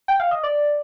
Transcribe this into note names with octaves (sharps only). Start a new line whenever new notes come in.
G5
F5
D#5
D5